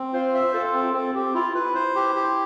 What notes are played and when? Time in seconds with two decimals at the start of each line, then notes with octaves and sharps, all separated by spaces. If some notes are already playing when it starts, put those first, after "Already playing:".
Already playing: C4
0.13 F4 C5
0.34 E5
0.53 F4 A4
0.74 C4
0.94 C4 A4
1.15 C4 G4
1.34 E4 F4
1.54 E4 B4
1.75 C5
1.95 G4
2.15 G4